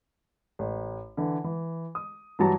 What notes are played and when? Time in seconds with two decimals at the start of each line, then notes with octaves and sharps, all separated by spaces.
0.59 A1
1.17 D3 E3
1.44 E3
1.95 D#6
2.39 G2 E3 F#3 F#4 A5 A#5